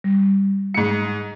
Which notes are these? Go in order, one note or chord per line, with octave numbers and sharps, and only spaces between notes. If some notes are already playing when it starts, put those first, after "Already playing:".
G3
G#2 C#7